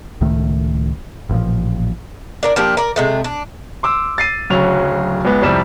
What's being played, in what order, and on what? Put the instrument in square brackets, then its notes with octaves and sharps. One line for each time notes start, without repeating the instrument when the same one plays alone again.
[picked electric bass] C#2 A2 D#3 A3
A1 A#2 F3
[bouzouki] D4 A#4 D5
F3 A#3 D4 G4
A#4 D5
C3 G#3 A3
D4
[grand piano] C6 D6 E6
A6 C7 D#7
D1 D2 C#3 F#3 F7
C#2 G#3 B3
C2 F2 C3 G3 E7